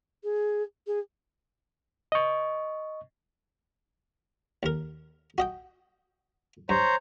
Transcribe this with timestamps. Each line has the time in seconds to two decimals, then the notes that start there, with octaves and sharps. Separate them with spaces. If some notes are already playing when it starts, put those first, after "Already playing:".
0.24 G#4
0.87 G#4
2.12 D#5 C#6
4.63 D#2 A#4
5.38 F#4 D#5 G5
6.69 G2 C5 C#5 A#5